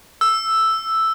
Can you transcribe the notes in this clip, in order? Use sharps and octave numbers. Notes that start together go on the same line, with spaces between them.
E6